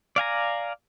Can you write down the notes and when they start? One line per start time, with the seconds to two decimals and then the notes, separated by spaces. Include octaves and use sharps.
0.16 D5 F5 G#5 A#5